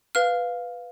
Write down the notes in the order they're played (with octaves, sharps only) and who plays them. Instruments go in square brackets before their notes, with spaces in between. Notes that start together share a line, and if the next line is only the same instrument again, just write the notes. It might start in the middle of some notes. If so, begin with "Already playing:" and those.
[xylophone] B4 F5 F6